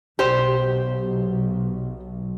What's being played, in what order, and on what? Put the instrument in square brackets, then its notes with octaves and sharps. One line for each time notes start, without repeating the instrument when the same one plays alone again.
[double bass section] B1 [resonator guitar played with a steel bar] G4 C5